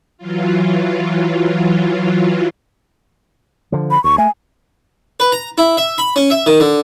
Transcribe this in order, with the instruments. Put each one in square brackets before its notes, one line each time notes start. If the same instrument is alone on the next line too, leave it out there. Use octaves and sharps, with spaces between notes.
[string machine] E3 F#3 F4
[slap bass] D3 F3
[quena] B5
[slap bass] D2 [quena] C#6
[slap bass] A3 [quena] G#5
[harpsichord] B4
A#5
E4
E5
B5
C#4
E5
D#3
D3